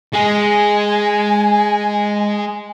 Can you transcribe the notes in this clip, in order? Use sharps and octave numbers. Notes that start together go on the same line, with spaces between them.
G#3 G#4 G#5